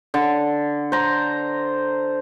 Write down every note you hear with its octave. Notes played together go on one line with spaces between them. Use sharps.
D3
C5 A#5